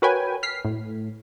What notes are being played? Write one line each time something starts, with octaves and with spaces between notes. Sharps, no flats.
F#4 A#4 B4 C#5 G5 G#5
F6 B6 C7
A2